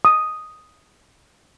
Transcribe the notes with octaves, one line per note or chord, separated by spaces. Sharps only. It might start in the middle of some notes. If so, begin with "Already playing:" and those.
D#6